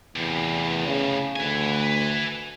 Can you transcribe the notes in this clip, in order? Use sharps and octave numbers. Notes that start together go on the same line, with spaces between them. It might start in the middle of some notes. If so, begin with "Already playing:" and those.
E2 A2 C3
C#3
D2 B4 G#5